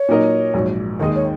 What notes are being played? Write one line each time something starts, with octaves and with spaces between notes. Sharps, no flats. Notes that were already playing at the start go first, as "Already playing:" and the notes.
Already playing: C#5
A#2 F#3 D#4 A#4 D#5
A#1 G#2 F#3
D#2 D#3 G#3 D#4 G#4 D#5
C#5